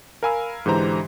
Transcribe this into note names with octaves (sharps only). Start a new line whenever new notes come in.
A#4 F5 G#5 B5 E6
G#2 D3 E3 G4 C5 A#5